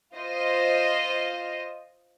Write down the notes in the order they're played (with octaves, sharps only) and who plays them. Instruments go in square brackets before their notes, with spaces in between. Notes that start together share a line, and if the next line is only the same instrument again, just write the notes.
[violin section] F4 C5 D#5